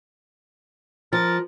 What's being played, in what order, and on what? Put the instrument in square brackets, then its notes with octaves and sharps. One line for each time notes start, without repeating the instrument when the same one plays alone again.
[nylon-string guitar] F3 [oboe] A#4 [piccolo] A6